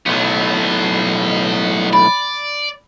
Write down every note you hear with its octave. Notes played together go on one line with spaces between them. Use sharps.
B1 A2 F#3 B3
D5 B5